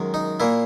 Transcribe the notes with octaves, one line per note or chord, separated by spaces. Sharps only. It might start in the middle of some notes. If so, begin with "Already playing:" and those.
Already playing: F#2 D#3 G#3
D#4
A#2 A#3 E4